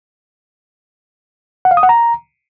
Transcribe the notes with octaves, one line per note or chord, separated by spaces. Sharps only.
F#5
F5
D#6
F#5
A#5